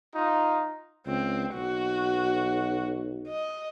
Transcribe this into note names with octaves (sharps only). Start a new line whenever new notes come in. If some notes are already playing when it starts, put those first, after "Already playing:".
D#4 F4
C#2 C4
B1 F#4
D#5